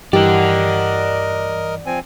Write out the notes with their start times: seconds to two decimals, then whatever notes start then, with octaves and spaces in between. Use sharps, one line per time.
0.13 G2 E3 G4 A#4 D5 D#5 F#5
1.86 F3 C4 G#5